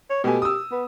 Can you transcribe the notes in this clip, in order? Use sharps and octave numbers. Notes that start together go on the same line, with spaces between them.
C#5
B2 A3 G4 G#5
D#6 E6
B3